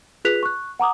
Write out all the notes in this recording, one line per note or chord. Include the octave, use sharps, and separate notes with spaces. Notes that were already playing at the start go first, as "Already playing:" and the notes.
F4 G#4 B4 F#6 B6 F7
C#6 F#6
F#5 A#5 D6 D#6